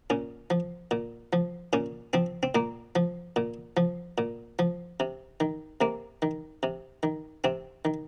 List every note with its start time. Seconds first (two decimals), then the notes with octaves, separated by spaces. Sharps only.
0.10 A#2 C#4
0.50 F3
0.91 A#2
1.33 F3
1.73 A#2 C#4
2.13 F3 C4
2.43 C4
2.55 A#2 A#3
2.96 F3
3.36 A#2
3.77 F3
4.18 A#2
4.59 F3
5.00 C3
5.40 D#3
5.81 C3 A#3
6.22 D#3
6.63 C3
7.03 D#3
7.44 C3 C4
7.85 D#3